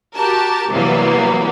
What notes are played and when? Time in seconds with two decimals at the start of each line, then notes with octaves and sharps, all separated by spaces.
0.16 F#4 G4 A#4 A5
0.71 C3 E3 F#3 G3 A#3 B3